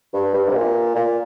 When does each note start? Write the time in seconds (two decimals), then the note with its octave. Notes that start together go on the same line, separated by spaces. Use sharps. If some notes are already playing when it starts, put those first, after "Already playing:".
0.13 G2
0.34 G2
0.48 C3
0.55 A#2
0.95 A#2